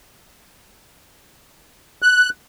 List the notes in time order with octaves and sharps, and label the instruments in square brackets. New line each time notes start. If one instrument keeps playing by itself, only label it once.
[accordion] F#6